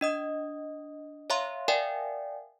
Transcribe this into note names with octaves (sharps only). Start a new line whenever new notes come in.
D4 D#5 D#6
C#5 E5 F5 A#5 C6
A#4 D5 E5 F5 G5 G#5